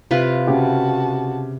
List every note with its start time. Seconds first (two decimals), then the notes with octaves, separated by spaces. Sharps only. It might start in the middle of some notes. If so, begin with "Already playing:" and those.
0.11 C3 F4 B4
0.47 C#3 F#4 G4 A5